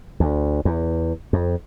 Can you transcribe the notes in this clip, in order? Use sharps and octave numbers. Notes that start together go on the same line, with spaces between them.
D2
E2
F2